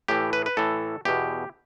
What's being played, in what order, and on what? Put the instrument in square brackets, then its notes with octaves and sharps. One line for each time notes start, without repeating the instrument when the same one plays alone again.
[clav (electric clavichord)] A2 E3 G4
B4
B4
A2 E3 A4
E2 B2 G4